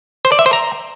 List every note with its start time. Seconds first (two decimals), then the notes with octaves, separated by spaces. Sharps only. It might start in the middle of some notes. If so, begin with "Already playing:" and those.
0.25 C5
0.32 D5
0.39 E5
0.46 C5
0.53 A#5